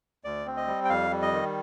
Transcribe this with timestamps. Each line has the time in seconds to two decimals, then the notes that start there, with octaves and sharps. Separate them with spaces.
0.24 D2 D5
0.46 C4
0.57 D#5
0.67 G3
0.85 G5
0.89 F2 F5
1.11 G3
1.22 D#5
1.33 D#3